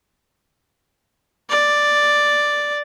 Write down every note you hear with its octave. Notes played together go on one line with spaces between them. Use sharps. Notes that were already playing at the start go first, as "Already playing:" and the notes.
D5